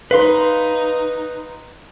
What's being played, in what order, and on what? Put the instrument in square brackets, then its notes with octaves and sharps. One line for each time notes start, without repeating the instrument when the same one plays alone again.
[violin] D#4 [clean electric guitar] B4 F5 C6